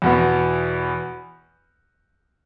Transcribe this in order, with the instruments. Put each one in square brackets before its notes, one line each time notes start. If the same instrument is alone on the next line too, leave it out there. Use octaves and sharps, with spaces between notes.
[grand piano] E2 B2 B3